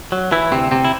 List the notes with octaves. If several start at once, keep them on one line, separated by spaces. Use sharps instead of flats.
F#3
E3 E4
D2 C3 C4
C3 C4
E4